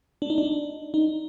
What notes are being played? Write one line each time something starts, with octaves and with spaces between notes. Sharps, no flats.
D4
D#4
D4
D#4